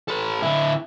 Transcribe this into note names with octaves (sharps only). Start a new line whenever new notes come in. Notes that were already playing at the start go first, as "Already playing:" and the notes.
A4 B4
D3 E4